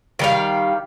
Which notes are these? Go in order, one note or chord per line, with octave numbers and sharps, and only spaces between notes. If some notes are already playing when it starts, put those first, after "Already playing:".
D#3 G3 F5